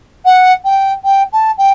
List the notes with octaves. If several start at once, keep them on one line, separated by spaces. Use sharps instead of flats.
F#5
G5
G5
A5
G5